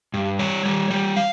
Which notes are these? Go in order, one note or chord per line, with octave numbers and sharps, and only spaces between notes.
G2
G3 C#5
G3
G3
F5